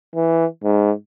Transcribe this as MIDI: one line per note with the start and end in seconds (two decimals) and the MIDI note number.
0.15 0.46 52
0.64 0.91 44